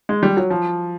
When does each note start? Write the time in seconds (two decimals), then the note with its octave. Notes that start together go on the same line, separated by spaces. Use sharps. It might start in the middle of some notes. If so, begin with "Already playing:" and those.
0.09 G#3
0.23 G3
0.37 F#3
0.50 F3